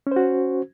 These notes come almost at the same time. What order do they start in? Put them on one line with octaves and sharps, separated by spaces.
C#4 C5 F#4